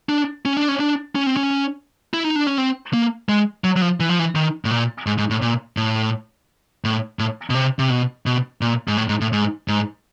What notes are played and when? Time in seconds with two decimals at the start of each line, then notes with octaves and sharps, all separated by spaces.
0.09 D4
0.45 C#4
0.57 D4
0.68 C#4
0.80 D4
1.15 C#4
1.26 C4
1.37 C#4
2.14 E4
2.24 D#4
2.36 D4
2.47 C#4
2.58 C4
2.93 A#3
3.29 G#3
3.64 F#3
3.76 F#3
3.82 F3
4.00 E3
4.09 F3
4.19 E3
4.35 D#3
4.65 A2
4.71 A#2
5.06 G#2
5.18 G#2
5.30 A2
5.42 A#2
5.77 A2
6.84 A2
7.19 A2
7.50 B2
7.55 C3
7.79 C3
7.90 B2
8.26 B2
8.61 A#2
8.88 G#2
8.97 A2
9.09 G#2
9.21 A2
9.33 G#2
9.68 G#2